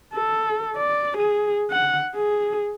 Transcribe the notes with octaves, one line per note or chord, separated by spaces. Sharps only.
A4
D5
G#4
F#5
G#4